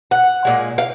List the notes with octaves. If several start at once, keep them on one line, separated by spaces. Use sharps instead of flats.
F#5
A#2 G#3
F5